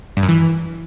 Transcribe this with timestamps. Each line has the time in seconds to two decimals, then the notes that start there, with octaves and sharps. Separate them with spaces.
0.17 G2
0.23 F#2
0.29 E3